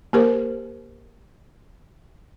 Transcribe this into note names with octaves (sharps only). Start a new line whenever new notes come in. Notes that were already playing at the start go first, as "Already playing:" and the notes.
A#3 G4 A#4 C5